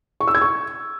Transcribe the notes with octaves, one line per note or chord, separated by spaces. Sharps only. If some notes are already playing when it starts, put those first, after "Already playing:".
C#6
E6
G#6
C#6